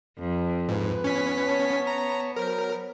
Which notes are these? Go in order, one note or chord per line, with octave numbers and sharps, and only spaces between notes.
F2
G#2 B4
B3 C#4 B6
C#5 A5
A#5
F#3 A#4 C5